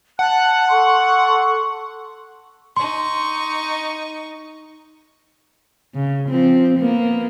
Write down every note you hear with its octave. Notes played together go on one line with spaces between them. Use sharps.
F#5 A5 F#6
A4 C6 C#6
D#4 C6 C#6
C#3
F3 C4
A#3 B3